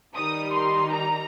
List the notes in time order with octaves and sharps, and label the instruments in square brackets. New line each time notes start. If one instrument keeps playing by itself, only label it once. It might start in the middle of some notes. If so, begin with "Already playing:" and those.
[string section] D#3 G3 D#4 D#6
C6
A#5